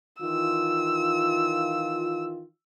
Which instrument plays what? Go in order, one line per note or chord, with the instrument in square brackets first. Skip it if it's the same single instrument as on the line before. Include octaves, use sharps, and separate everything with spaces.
[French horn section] D#3 E3 F4 [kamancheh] E6